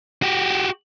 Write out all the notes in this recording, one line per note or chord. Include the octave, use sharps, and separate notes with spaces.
F#4 G4